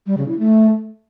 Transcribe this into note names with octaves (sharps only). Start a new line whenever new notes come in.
G3
C#3
E4
A3